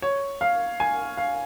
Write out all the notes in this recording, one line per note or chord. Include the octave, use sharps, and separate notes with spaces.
C#5
F5
G#5
F5